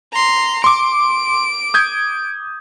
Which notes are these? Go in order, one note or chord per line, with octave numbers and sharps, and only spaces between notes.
A#5 C6
C6 D6 D7
D#6 G6 G#6